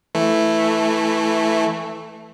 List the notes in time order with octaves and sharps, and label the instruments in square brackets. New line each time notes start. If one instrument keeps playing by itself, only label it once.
[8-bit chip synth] E3 A3